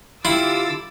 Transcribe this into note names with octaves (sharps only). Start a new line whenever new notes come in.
D3 E4 F4 G4 D6 E6 A6